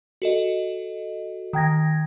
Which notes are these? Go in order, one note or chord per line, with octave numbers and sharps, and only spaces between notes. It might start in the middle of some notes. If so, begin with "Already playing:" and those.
F#4 A4 D#5
D#3 G5 G#6 A#6